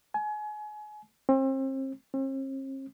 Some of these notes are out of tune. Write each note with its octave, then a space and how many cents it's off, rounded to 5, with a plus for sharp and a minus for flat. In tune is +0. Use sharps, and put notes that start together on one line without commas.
G#5 +30
C4 +35
C4 +45